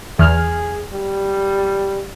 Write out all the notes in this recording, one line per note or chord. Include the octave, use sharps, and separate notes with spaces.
E2 G#4 F6
G3